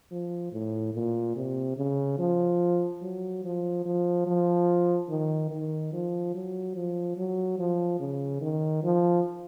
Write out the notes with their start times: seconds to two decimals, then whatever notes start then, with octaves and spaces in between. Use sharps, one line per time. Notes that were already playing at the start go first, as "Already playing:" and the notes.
0.12 F3
0.52 A2
0.94 A#2
1.36 C3
1.77 C#3
2.18 F3
3.02 F#3
3.44 F3
3.85 F3
4.27 F3
5.09 D#3
5.51 D#3
5.93 F3
6.34 F#3
6.75 F3
7.17 F#3
7.59 F3
8.00 C#3
8.41 D#3
8.83 F3